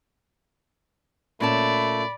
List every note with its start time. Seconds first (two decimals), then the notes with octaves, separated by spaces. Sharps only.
1.40 A#2 A3 C#4 D5 A5 B5